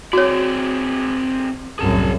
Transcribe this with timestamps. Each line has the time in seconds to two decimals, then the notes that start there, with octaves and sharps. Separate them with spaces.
0.13 C4 F#4 G#4 C#5 D5
1.79 C2 F#2 A2 G#4 A5